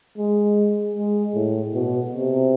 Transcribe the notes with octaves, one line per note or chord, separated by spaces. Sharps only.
G#3
G#3
A2
B2
C3